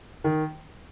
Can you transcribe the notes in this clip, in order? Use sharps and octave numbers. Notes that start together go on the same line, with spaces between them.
D#3